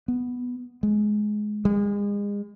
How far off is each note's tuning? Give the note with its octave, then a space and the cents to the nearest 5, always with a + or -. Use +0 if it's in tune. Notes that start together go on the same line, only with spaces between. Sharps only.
B3 +0
G#3 +20
G#3 -35